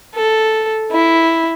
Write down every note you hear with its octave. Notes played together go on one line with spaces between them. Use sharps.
A4
E4